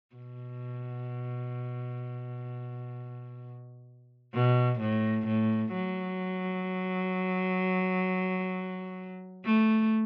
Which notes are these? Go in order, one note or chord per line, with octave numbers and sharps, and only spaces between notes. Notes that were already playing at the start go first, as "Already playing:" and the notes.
B2
B2
A2
A2
F#3
A3